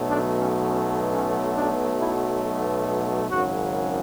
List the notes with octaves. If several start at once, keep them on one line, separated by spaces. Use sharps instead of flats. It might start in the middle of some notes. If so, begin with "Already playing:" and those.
Already playing: B1 B2 F#3 A3
D4
C#4
C#4
C#4
D4
E4
G#1 F#2 C#3 F#3 F#4